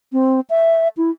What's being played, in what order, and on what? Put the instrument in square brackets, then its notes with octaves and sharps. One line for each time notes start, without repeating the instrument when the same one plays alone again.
[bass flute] C4
E5
E4